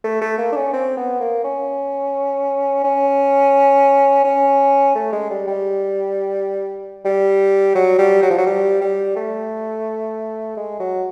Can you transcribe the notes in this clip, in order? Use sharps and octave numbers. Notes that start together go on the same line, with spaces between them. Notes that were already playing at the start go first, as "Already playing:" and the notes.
A3
A3
A#3
D4
C#4
C4
B3
A#3
C#4
C#4
C#4
A3
G#3
G3
G3
G3
F#3
G3
F#3
F3
F#3
G3
G3
A3
G#3
F#3